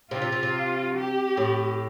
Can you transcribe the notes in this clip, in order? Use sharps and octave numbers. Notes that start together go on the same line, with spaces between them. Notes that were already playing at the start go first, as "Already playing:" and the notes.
C3 F4
C3
C3
C3
G4
A2